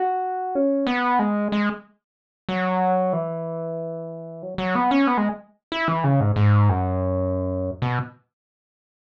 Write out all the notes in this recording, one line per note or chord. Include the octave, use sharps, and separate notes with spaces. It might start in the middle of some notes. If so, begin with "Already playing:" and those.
Already playing: F#4
C#4
B3
G#3
G#3
F#3
E3
F#3
F#3
B3
C#4
B3
G#3
E4
E3
C#3
G#2
G#2
F#2
B2